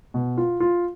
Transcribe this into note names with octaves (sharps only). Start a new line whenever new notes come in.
B2
F4
F4